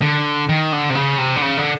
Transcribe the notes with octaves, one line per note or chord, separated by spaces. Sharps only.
D3
D#3
D3
C3
C#3
C3
D3
C#3
D3